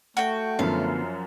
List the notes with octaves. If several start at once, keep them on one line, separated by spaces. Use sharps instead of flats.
A3 F#4 G5
F#2 D3 F3 B3 C#4 F5